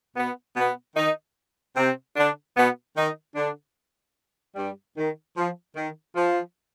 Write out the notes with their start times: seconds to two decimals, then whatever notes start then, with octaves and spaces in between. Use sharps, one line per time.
0.17 B2 B3
0.56 B2 B3
0.96 D#3 D#4
1.76 C3 C4
2.16 D3 D4
2.56 B2 B3
2.96 D#3 D#4
3.36 D3 D4
4.56 G2 G3
4.96 D#3
5.36 F3
5.76 D#3
6.15 F3